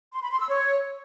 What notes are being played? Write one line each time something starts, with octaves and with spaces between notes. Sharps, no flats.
C6
B5
C6
E6
C#5